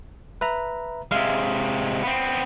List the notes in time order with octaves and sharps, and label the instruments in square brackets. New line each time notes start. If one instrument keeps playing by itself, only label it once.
[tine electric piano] B4 E5 A#5
[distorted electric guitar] C3 G#3 [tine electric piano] E5 F5
[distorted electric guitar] B3 C4